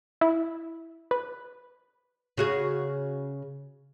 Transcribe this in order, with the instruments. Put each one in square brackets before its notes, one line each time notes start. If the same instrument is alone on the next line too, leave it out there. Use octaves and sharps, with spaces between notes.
[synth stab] E4
B4
[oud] C#3 F#4 G#4